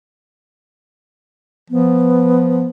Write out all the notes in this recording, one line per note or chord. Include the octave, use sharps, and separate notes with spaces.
F3 B3